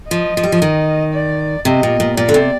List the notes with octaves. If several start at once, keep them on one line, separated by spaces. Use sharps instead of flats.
F3 D#5
F3
G3
F3
D#3
D5
C3 D#5
A#2
A#2
A#2 D5
D3
C3